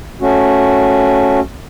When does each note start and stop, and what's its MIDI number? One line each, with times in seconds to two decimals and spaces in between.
0.22 1.40 57
0.22 1.40 61
0.22 1.40 66